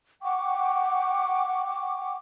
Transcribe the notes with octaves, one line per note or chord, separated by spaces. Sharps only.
F#5 G5 C#6 D6